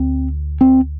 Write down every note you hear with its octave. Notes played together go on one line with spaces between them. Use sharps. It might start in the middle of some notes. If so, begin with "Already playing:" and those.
Already playing: D2 C4
C4